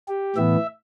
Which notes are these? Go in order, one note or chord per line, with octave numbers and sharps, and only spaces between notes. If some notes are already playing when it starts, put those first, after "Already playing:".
G4
A2 E3 B3 E5